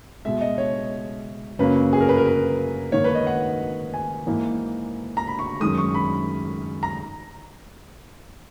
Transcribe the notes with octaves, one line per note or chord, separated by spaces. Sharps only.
B2 G#3 E5
D#5
C#5
F#2 C#3 F#3 A#3 B4
G#4
A#4
B4
A#4
B4
G#2 D#3 A#3 C#5
B4
D#5
F#5
G#5
G#2 E3 A#3
A#5
B5
C#6
F#2 D#3 G#3 D#6
C#6
B5
A#5